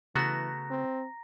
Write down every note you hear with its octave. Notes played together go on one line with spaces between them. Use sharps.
C#3 E3 A3 B3 F#4 A#5 A#6
C4